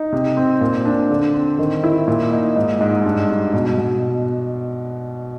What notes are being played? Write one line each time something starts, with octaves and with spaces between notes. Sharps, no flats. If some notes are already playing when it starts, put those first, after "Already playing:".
Already playing: D#4
C3
C4
A#2
D4
D3
C4
D#3
E4
A#2
D#4
G#2
G#2
G2
G2
B2
B2